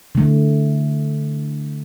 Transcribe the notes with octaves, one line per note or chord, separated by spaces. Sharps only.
D3 A3